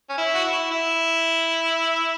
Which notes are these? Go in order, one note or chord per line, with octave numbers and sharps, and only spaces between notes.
C#4
E4
F#4
E4
E4